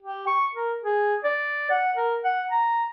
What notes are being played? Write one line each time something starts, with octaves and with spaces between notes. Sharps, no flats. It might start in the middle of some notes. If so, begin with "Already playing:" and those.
G4
C#6
A#4
G#4
D5
F#5
A#4
F#5
A#5